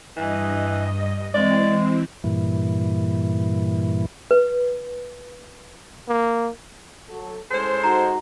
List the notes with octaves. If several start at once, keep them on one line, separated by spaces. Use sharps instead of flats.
G2 E3 D#5
E3 G#3 C4 D5
G2 A#2 E3
B4
A#3
F#3 A4
A2 G#3 C#4 A4 B4 C5
D#4 F#4 A#5